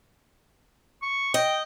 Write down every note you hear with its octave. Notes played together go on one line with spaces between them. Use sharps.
C#6
D#5 G5